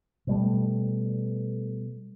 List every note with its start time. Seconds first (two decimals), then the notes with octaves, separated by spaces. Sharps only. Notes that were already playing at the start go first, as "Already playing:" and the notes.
0.27 B2 G3 A3